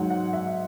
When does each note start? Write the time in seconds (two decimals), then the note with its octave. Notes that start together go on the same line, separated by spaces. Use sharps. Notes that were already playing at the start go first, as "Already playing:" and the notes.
Already playing: G#2 F#3 F#5
0.10 F#5
0.33 E5